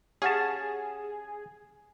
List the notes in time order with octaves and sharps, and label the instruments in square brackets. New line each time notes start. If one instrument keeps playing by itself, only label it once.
[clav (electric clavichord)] C#4 A5 [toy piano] G4 F5 F#5 [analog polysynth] G#4